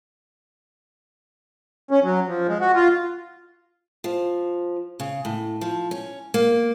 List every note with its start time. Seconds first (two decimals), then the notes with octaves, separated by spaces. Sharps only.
1.91 C#4
2.03 F#3
2.28 F3
2.48 G#3
2.61 F#4
2.75 F4
4.04 F3
5.00 C#3
5.25 A2
5.61 F3
5.91 C#4
6.34 A#3